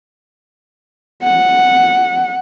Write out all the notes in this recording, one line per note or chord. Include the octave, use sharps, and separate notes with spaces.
F#5